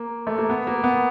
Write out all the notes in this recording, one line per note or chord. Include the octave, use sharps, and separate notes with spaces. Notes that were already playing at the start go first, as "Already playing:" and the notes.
Already playing: A#3
A3
A#3
B3
A#3
B3